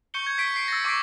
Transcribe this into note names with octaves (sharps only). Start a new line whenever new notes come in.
C#6 G6 C#7 G7
G#6 C#7
C#6 B6 D7
C7 D7
E6 A6 A#6
C#6 D6 E6 B6 C7 D7